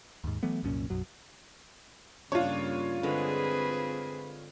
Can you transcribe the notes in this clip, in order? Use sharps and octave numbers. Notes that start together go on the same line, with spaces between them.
D#2 G#2
E3 F#3 A3 B3
C2 F#2 A#2 C#4
B1 F#2 F#3
G2 C#3 A#3 D4 F4 C#5
D3 G#3 C4 G#4 B4